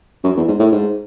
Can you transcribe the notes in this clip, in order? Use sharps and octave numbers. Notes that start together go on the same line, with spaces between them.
F#2
E2
G#2
A2
G#2